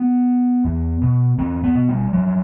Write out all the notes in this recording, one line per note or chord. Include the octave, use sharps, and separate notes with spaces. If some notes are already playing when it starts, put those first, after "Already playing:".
Already playing: B3
E2
B2
E2 C4
B3
B2
G3
G2 F#3